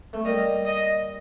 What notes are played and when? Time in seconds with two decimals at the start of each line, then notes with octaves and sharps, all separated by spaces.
0.13 A3
0.25 G3 A#3 D#5
0.65 D#5